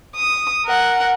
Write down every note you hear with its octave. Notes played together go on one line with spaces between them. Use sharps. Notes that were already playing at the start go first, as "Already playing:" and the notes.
D#6
A#4 F#5